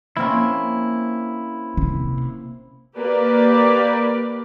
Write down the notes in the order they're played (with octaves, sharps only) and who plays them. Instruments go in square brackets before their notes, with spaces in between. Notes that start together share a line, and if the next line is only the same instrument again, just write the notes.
[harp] A#3 C4 C#4 [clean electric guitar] E4
[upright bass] C3
[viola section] A#3 G4 A#4 B4 D5